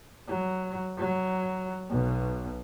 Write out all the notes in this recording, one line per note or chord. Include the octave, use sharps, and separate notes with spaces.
F#3
F#3
B1 B2